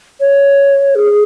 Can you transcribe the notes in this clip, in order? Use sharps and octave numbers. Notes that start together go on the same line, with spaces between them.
C#5
G#4